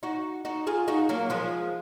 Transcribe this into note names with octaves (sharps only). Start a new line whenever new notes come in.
D#4 F#4
D#4 F#4
F4 G#4
D#4 F#4
F#3 A#3
F3 G#3